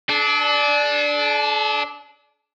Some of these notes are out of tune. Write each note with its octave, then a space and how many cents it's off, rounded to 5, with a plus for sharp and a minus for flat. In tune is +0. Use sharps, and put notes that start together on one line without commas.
D4 +0 A4 -45